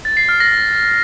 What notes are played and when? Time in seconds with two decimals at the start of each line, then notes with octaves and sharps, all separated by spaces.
0.05 A6
0.17 C7
0.29 F6
0.40 A#6